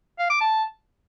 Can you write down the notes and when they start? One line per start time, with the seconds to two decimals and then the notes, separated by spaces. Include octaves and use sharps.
0.19 F5
0.30 D6
0.41 A5